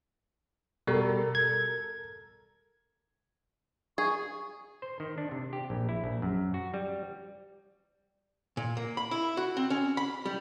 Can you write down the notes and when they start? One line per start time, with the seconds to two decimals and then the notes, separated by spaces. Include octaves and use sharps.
0.87 B2 G3 A4 A#4
1.35 G#6
3.98 G#4 C#6
4.82 C5
5.00 D#3
5.18 D4
5.31 C3
5.53 G4
5.70 A#1
5.89 E4
6.04 A#1
6.22 F#2
6.54 F#4
6.74 G3
8.57 A#2
8.77 A#3
8.97 B5
9.11 E4
9.37 F#4
9.57 C4
9.70 C#4
9.97 B5
10.26 G3